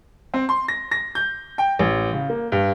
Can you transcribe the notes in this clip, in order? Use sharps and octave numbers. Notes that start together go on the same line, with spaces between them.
C4
C6
A#6
A#6
G6
G5
A1
C#3
A#3
G2